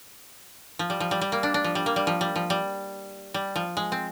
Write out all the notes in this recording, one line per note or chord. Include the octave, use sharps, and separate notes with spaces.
F3
G3
F3
G3
G3
A#3
D4
D4
F3
G3
A#3
G3
F3
G3
F3
G3
G3
F3
G#3
C4